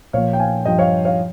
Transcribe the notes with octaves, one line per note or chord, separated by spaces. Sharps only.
A#2 F3 C#5 F5
G5
F5 G#5
G2 F3 D#5 G5
C#5 F5
C#5 F5